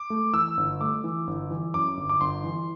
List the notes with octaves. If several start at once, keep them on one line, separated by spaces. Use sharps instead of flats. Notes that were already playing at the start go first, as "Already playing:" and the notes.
Already playing: D6
A3
E3 E6
G1
A3 D6
E3
G1
E3
F#2 D6
G1
D6
G1 C6
E3